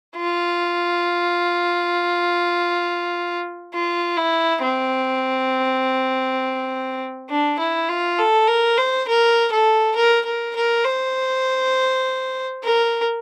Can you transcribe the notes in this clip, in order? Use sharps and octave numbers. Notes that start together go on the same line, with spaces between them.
F4
F4
E4
C4
D4
E4
F4
A4
A#4
C5
A#4
A4
A#4
A#4
A#4
C5
A#4